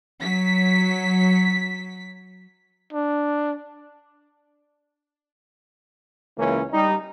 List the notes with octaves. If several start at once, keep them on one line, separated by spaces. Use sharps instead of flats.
F#3 B6
D4
C#2 C#3 E3 A#3 C#4
G3 D#4